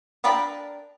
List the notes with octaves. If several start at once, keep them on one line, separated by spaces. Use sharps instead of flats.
D4 A#4 G5 A5 B5